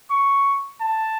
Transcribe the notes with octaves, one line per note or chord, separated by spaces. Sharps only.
C#6
A5